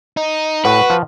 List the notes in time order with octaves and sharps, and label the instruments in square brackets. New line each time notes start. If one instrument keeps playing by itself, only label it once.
[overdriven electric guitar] D#4
[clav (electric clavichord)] A2 [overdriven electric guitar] F#4 [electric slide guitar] B4 [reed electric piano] F#5 C#6
[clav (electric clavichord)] F3